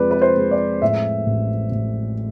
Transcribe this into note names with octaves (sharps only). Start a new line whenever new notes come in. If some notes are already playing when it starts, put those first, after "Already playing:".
Already playing: F2 G#3 C4 B4 D5
B4
C5
G#3
D5
A2 E5
A1
A1